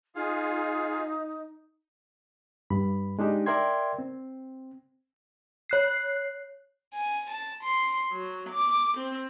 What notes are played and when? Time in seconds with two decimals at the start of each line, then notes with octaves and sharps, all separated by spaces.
0.15 D#4 F4 G#4 F5
2.70 G2 B5
3.19 G#3 D4 D#4 G4
3.46 A#4 D5 E5 G5 C6 G#6
3.99 C4
5.69 C#5 F#6 C7
6.93 G#5
7.31 A5
7.62 C6
8.11 F#3
8.49 D6
8.97 C4